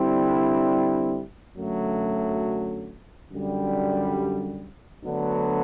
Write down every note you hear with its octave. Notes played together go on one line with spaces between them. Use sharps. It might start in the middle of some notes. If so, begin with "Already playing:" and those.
Already playing: D3 G3 C4 E4
F#2 D3 F#3 A3
F#2 D3 G3
D2 D3 F#3 B3 D4